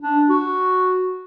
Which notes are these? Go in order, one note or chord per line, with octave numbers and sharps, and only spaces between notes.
D4
F#4